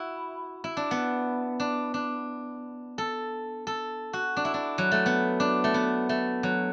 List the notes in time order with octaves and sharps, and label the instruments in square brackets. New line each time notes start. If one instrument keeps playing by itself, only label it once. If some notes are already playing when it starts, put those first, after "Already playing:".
Already playing: [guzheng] E4 F#4
E4
D4
B3
D4
D4
A4
A4
F#4
D4
E4
D4
F#3
A3
B3
D4
A3
B3
A3
F#3